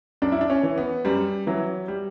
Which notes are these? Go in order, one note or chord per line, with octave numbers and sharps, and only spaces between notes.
F#2 D4
E4
D4
C#4
E3
B3
F#2 G3
E3 F#3
G3